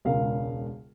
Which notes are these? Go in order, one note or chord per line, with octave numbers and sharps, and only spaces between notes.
E1 C#2 C#3 A#4 F5